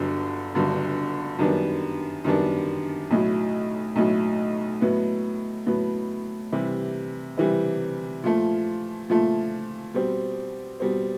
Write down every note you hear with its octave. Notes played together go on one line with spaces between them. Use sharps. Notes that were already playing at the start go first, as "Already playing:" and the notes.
Already playing: G1 G2 D3 F#3
G1 G2 D3 F#3
F#2 D#3 G3 B3 D4
F#2 D#3 G3 B3 D4
B1 A2 F#3
B1 A2 F#3
A2 F#3 B3
A2 F#3 B3
C3 E3 G3
C3 E3 G3
A#2 F3 A3
A#2 F3 A3
B2 G3 C4
B2 G3 C4